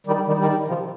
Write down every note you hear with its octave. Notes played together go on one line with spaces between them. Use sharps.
D#3 G3
D#3 G3
D#3 G3
C3 F3